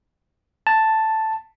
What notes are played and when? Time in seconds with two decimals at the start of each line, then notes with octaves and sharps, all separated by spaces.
0.67 A5